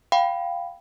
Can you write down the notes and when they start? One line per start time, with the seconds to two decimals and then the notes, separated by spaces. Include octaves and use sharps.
0.12 F5 G5 B5